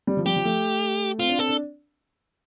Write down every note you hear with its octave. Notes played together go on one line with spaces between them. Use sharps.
G3
F3
G3 G4
F3
A3
C4 F4
D4
C4 A4
D4